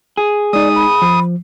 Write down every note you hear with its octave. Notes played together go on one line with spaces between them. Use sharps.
G#4
G#3 D#4 D5 D#6
B5
F3